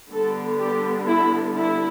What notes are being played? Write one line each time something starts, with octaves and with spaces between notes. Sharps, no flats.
D3 G3 B3 A4
G4
E4
E4